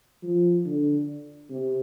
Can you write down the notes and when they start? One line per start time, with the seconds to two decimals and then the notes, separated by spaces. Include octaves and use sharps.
0.23 F3
0.66 D3
1.50 C3